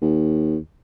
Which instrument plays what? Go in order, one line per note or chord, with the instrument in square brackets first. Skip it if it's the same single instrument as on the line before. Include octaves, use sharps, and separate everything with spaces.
[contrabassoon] D#2